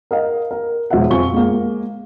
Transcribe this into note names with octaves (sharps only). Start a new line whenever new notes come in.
A#4 D#5 F5
A#4
E1 F3 B3 E5 F#5
F2 F4 G#5 C#6 G7
G#3 A#3